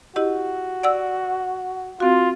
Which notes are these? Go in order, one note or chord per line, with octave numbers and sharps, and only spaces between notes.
E4 F#4 G4 D#5
D5 F#5 E6
C4 F4 F#4